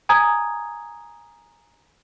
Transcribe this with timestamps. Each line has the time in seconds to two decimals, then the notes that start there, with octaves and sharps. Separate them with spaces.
0.09 G#5 A#5 D#6 G#6